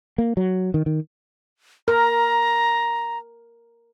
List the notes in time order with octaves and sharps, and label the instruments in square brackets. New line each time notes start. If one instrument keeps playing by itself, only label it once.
[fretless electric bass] A#3
F#3
D#3
D#3
[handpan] A#4 [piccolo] A#5